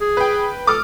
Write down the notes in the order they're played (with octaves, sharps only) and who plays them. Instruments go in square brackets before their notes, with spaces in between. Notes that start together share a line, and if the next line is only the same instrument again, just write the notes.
[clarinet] G#4
[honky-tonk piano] B4 G5
[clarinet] A4 [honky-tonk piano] D6 D#6 F6